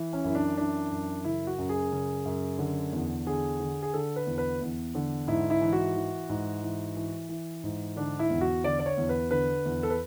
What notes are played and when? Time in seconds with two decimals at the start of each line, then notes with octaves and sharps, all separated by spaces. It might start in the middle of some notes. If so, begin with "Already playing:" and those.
Already playing: E3
0.13 C#4
0.24 F#2 E4
0.35 D4
0.57 E3 D4
0.91 F#2
1.25 C#3 E4
1.47 F#4
1.58 F#2
1.69 G#4
1.92 C#3
2.26 F#2
2.59 D3
2.93 E2
3.26 D3 G#4
3.60 D3
3.83 G#4
3.94 D3 A4
4.16 B4
4.27 E2
4.38 B4
4.61 E2
4.95 D3
5.27 G#2 E4
5.50 E4
5.61 E3
5.73 F#4
5.96 E3
6.29 G#2
6.62 E3
6.96 E3
7.29 E3
7.64 G#2
7.96 D3 D4
8.19 E4
8.30 E2
8.41 F#4
8.64 D3 D5
8.79 D5
8.86 C#5
8.97 E2
9.09 B4
9.31 D3 B4
9.65 E2
9.83 A4
9.90 B4